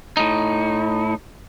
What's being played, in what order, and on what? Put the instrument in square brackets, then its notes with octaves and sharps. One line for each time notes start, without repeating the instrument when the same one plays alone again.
[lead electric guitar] A2 D#4